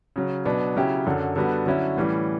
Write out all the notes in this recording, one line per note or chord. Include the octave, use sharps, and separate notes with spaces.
C#3 F#3 C#4
B2 F#3 B3 D4
C#3 F#3 C#4 E4 G4
F#2 D3 F#3
D3 G3 B3 F#4
D3 F#3 C#4 E4
A2 E3 G3 C#4